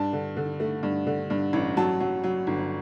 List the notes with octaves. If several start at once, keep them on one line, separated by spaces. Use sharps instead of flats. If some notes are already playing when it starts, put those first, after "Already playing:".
Already playing: G2 A5
D3
D3
A3
G2
D3
G2
A1
F#3 A5
F#3
F#3
G1